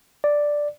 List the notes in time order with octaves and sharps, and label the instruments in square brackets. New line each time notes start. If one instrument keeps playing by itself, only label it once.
[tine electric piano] D5